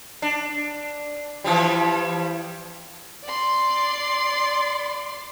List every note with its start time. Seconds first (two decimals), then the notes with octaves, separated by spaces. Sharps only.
0.22 D4
1.44 E3 F3 G3
3.25 D5 C6